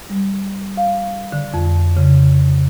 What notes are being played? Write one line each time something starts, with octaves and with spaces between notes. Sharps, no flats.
G3
F5
D3
F2
C#3